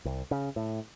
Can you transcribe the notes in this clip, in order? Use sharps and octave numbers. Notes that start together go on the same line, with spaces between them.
C2
C#3
A2